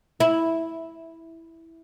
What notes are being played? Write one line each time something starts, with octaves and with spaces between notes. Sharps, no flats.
E4